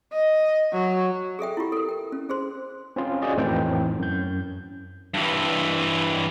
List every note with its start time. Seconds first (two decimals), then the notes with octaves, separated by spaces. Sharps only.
0.13 D#5
0.73 F#3
1.39 G#4 A4 E5 G5
1.57 E4 F4 G4
1.72 A4 A#4
1.89 A#4 G5
2.12 C#4
2.29 C#4 G#4 C5 C6
2.96 C4 C#4 F4
3.22 C#4 F4 F#4 G#4 D5 D#5
3.36 F2 A2 E3 C4 D#4 G5
3.99 F#2 G6
5.14 G2 E3